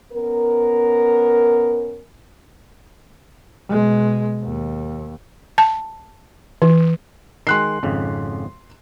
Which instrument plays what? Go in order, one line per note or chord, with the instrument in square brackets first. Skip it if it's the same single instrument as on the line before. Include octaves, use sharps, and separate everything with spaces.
[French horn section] B3 C#4 A#4
[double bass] B2 G#3
D#2
[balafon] A5
E3
[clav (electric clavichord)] D#3 G#3 [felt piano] C6 F#6 C7
[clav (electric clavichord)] G#1 F2 C#3